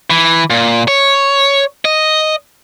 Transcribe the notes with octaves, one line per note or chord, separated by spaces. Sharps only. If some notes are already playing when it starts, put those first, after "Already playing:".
E3
A#2
C#5
D#5